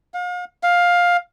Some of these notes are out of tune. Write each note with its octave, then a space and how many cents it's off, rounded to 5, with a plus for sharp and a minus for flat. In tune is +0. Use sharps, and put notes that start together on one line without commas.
F5 +40
F5 +15